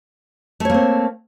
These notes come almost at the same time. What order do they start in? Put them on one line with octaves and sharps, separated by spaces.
A3 C#5 A#3 C4